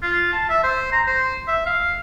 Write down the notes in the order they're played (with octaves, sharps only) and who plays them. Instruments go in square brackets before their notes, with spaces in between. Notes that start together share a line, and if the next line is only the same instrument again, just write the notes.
[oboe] F4
A5
E5
C5
A#5
C5
E5
F5